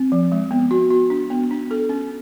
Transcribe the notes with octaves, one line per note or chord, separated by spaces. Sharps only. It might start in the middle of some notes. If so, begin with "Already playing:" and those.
Already playing: C4
F3
G#3
B3
F#4
F#4
D4
B3
D4
A4
C#4